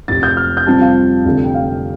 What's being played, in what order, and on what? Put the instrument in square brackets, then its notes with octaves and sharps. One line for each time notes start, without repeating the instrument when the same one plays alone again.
[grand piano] F1 F2 C3 A6
G6
F6
G6
F2 C3 G3 C4 F4 A5
F5
F1 F2 D3
G5
F5